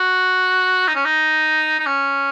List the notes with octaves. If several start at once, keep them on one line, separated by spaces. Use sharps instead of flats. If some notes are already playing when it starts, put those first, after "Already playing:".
Already playing: F#4
D#4
C#4
D#4
D#4
C#4